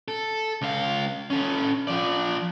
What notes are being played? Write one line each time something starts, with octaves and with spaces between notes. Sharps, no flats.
A4
C#2 F5
C#4 A4
F3 D5